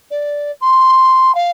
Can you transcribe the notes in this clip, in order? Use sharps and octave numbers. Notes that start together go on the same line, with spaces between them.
D5
C6
F5